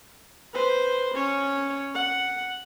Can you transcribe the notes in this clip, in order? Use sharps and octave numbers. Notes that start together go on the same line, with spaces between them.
B4 C5
C#4 C#5
F#5